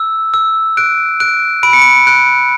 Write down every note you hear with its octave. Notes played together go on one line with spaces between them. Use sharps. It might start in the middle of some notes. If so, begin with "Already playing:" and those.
Already playing: E6
E6
F#6 D7
F#6 D7
B5 D7
C#7
D7
F#6 D7